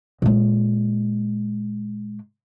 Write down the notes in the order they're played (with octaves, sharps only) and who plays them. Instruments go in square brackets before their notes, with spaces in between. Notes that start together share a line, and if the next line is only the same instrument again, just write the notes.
[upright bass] A#2 G#3